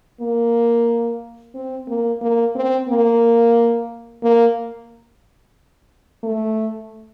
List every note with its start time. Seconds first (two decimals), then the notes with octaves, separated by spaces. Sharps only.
0.21 A#3
1.54 C4
1.88 A#3
2.21 A#3
2.55 C4
2.89 A#3
4.23 A#3
6.23 A3